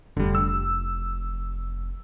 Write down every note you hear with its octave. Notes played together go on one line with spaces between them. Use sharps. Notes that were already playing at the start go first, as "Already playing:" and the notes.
F1 D3 G3
E6